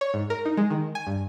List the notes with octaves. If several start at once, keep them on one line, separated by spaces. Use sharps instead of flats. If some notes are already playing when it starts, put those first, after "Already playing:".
C#5
G#2
A#4
D#4
G#3
D#3
G#5
G2